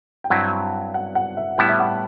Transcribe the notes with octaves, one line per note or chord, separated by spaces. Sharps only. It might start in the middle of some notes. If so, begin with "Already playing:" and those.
G5
G2 F#3 C4 E4 F#5
F#5
F#5
E5
A2 G3 B3 E4 G5
E5
F#5